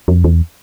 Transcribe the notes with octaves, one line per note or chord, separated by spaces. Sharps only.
F2
E2